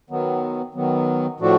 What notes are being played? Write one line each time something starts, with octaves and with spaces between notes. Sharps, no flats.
D#3 F#3 B3
D#3 F#3 B3
A2 F3 A3 D4 F#4